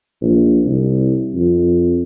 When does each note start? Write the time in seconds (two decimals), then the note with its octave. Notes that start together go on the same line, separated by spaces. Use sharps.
0.21 A#1
0.65 C2
1.34 F2